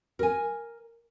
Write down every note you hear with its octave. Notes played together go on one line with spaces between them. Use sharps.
A#4 G#5